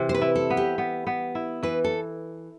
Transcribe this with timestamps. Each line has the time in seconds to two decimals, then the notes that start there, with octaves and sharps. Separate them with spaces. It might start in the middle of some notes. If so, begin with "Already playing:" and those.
Already playing: C3 E3
0.09 C5
0.14 B4
0.22 E4
0.35 A4
0.50 B3
0.57 G4
0.78 B3
1.07 B3
1.35 E4
1.63 E3 B4
1.84 A4